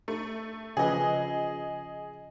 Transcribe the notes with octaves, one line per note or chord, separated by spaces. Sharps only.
A3
C#3 F3 G#4 B4 D#5